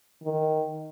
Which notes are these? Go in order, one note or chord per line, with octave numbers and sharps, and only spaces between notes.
D#3